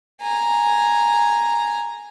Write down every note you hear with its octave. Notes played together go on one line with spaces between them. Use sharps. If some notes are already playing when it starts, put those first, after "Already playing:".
G#5 A#5